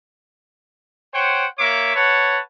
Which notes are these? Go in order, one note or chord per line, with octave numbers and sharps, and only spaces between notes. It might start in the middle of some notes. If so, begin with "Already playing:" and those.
C5 C#5 F#5 G5
A#3 C#5 E5 D6
B4 C#5 F#5 A5